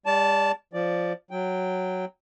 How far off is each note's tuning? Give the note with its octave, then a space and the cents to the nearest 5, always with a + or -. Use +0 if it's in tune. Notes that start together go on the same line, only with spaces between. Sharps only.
G3 +40 D5 -30 A5 +0
F3 +0 D5 +0
F#3 +0 G5 +0